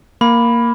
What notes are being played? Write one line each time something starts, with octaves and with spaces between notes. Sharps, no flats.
A#3 B5